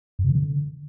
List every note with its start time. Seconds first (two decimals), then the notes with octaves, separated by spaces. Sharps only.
0.19 F#2
0.24 C3
0.30 D#3
0.35 D3